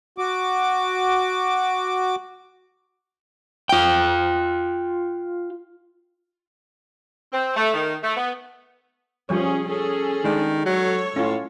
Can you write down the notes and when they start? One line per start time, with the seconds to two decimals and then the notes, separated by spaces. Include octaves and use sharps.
0.18 F#4 D6
3.69 F4 G5
7.33 C4
7.57 A3
7.74 D#3
8.03 A3
8.17 B3
9.29 F3 G3 C#4 G#4 C#5
9.65 C#4 G#4 A4
10.24 D#3 G#3 D4
10.66 F#3 A4 C#5
11.16 A2 C#4 F4